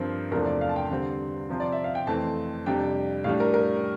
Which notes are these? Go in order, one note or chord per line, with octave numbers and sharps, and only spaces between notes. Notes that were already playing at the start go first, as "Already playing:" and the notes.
Already playing: G2 F3 C4 A#4
E2 C3 F3 A3 D4 A#4
D5
F5
A5
G5
D3 G3 C4
C3 F3 C4
D5
E5
F5
G5
F2 E3 A3 C4 A5
F2 C3 G3 D4 G5
A2 G3 D4 F5
A#4
A#4